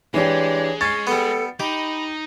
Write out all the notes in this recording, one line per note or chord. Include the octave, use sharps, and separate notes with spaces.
E3 G#3 D4 G4 C#5
C#4 A6 C7
G3 B3 A4
D#4 G4 B5